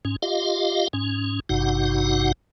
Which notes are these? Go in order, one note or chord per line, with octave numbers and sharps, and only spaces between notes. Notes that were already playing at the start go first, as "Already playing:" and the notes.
G#2 C#4
F4 G4 D#5 F5
G#2 C#4
G#1 G2 C3 D#4 F#4 F#5